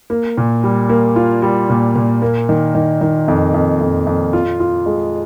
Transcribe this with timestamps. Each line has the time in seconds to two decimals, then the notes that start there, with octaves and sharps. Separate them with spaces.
0.10 A#3
0.38 A#2
0.64 G3
0.89 A#3
1.16 F4
1.42 G3
1.70 A#2
1.96 A#2
2.22 A#3
2.49 D#3
2.75 D#3
3.01 D#3
3.28 F2
3.54 F2
3.81 F2
4.07 F2
4.33 F4
4.60 F4
4.86 G#3